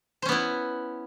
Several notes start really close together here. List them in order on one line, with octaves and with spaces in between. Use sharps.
C5 C#4 B3 E4